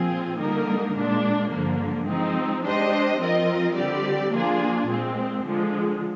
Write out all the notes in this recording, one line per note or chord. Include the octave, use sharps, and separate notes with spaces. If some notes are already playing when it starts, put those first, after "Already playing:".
Already playing: A#2 F3 C4 F4 G#4
D3 G3 A#3 D#4 A#4
A#2 G#3 D4
G2 D3 F3 A#3
F3 G#3 C4 D#4
G#3 D4 G4 C5 D#5
F3 C4 F4 A#4 D#5
D3 G3 C4 G4 D5
F3 A#3 D4 F4 G#4
A#2 G#3 C4
D3 F3 G#3